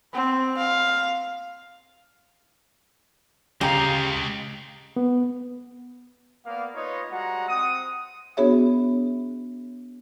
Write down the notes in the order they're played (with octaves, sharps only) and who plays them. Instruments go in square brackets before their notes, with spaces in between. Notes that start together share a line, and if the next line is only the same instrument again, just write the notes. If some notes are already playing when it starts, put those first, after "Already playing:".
[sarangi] C4
F5
[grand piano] C#3 A#5 [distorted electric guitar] G#3 F5 [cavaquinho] G4
[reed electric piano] B3
[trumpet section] A#3 B3 D5 F5
D#4 F4 B4 C#5 D#5
G3 G#3 F#4 F#5 A#5
C4 F#5 D#6
[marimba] B3 D4 F#4 G#4 C#5 E5